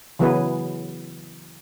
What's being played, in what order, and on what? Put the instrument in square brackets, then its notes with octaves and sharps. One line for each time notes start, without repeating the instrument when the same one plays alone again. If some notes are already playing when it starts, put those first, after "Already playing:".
[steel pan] C#3 E3 F#3 B3 G#4 B4